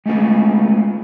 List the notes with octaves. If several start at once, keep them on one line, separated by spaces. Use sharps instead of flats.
G#3 A3 B3 C#4 F4